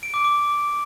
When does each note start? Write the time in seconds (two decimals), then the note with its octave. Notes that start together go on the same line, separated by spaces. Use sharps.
0.03 D7
0.14 D6
0.25 D6